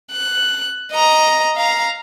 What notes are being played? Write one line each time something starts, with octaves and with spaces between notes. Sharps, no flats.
F#6
D#5 A#5
F5 A#5